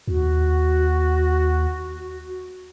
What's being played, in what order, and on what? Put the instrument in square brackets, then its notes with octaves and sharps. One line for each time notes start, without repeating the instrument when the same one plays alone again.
[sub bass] D#2 [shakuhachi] F#4